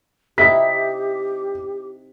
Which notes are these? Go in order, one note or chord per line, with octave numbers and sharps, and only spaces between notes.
C3 D#4 E4 G4 B6